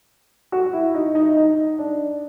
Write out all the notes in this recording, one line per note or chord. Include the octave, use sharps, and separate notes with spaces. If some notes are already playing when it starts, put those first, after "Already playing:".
F#4
E4
D#4
D#4
D#4
D4